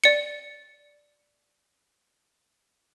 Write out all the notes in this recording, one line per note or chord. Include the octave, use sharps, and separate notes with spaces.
D5 C#7